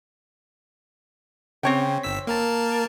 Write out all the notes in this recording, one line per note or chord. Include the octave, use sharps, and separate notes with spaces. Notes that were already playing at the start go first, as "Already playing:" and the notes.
C#3 C4 C#5 G5
G1 E6 B6
A#3 A#4 A5